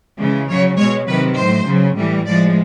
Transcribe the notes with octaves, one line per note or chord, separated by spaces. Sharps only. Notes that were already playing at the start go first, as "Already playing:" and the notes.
C#3 E3 G#3
C#3 F#3 C#5
B2 G#3 C#5
C3 D#3 F#3 B4
A2 F#3 C5
C#3 F#3
A2 E3 G3
A2 F3 G#3 D5